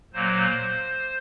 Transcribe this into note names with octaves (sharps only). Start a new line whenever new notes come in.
A#2 F#3 A#3 C5